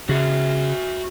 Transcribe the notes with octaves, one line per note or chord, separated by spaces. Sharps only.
C#3 F#4 E5